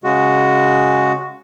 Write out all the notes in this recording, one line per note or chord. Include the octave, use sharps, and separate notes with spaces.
C#3 G#3 F#4